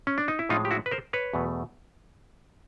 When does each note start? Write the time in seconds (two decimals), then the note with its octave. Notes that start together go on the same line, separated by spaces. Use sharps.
0.07 C#4
0.18 D4
0.28 D#4
0.39 E4
0.49 A2 F3 G#3 D#4 F4
0.65 G4
0.71 E4 F#4
0.86 B4
0.91 A#4 C5
1.13 B4 C#5
1.33 E2 B2 F#3 A3